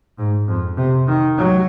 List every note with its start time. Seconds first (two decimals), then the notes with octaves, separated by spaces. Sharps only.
0.18 G#2
0.48 F2
0.77 C3
1.08 D#3
1.38 F#3